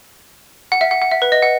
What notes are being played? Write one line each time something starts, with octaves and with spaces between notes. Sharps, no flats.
F#5
E5
F#5
F#5
E5
B4
D#5
F#5